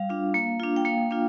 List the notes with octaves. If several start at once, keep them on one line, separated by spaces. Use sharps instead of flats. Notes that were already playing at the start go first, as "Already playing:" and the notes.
Already playing: G3 F5
D4 F4
A#3
D4 F4
G5
A#3 F5
D4 F4